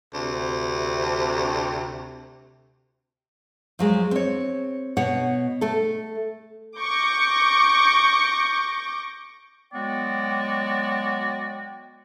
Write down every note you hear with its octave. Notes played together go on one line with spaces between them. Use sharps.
D2 C3
F3 F#3 G#3
C4 C#5
B2 C#5 F#5
A3 A4
C#6 D6 G6 A#6
F#3 G#3 B3 F#4 D5 G5